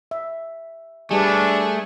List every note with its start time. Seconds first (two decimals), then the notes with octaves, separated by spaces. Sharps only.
0.11 E5
1.11 G3 A3 D4 G4 G#4 B4